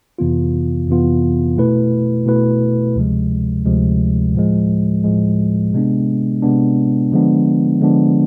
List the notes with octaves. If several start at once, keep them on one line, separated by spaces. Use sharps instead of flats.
F2 C3 E3 B3 F4
F2 C3 E3 B3 F4
B2 A3 E4 B4
B2 A3 E4 B4
D2 C3 F3 G#3
D2 C3 F3 G#3
A2 F3 G#3
A2 F3 G#3
C3 G#3 B3 D4
C3 G#3 B3 D4
D3 F3 G#3 B3 D4
D3 F3 G#3 B3 D4